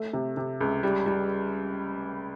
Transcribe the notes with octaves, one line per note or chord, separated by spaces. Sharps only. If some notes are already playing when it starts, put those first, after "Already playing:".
Already playing: A3
C3
C3
C#2
G3
G3